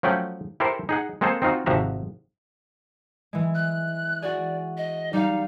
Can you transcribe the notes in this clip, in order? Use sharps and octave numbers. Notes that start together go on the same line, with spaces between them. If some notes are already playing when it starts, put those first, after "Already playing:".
F3 F#3 A3 C#4 F#5 G5
E4 G4 A4 A#4 C5
D#4 G#4 F#5
G#3 A#3 C4 G#4 A4 C5
C4 D#4 F4 F#4
G#1 C3 F3 F#4 E5 A#5
E3 G#3
F#6
F#4 G#4 D5
D#5
G3 D#4 F5